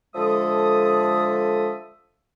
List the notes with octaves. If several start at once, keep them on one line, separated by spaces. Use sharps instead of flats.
D3 F3 G#3 A4 E5 D#6